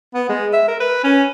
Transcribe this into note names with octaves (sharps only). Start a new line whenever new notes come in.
B3
G#3
E5
A#4
B4
C#4